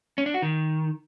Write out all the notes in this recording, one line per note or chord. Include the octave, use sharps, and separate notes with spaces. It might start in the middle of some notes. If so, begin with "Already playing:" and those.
C#4
D4
F#4
D#3